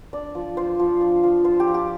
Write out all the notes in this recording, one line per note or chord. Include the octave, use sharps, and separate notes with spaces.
D4 D5
F3
F4 C5
F3
D4
F3
F4 C5
G4
F3
G4